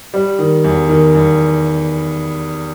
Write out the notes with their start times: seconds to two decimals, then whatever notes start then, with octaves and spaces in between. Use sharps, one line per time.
0.14 G3
0.39 D#3
0.64 E2
0.89 D#3
1.15 E2